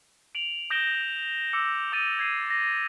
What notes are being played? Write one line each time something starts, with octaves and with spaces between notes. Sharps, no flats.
D7 F7 F#7
D#6 G6 A#6 D7 E7 G7
D6 E6 C#7
D6 D#6 A6 D#7
G#6 C7 D#7
A#6